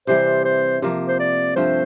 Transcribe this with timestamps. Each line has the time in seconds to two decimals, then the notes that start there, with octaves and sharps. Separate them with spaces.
0.07 C3 E3 G3 C4 C5
0.45 C5
0.82 C3 F3 A#3
1.08 C5
1.19 D5
1.56 G2 F3 A3 C4 C5